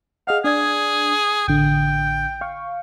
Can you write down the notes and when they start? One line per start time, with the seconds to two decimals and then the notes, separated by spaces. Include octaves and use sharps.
0.27 G#4 D#5 F5 F#5
0.44 D4 G#4 D5 G#6
1.48 A1 D3 G5
2.41 F5 C#6